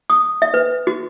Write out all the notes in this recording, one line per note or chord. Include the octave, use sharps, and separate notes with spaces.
D#6
E5
B4
F#4